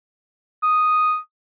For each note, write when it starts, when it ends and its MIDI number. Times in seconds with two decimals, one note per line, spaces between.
0.63 1.18 87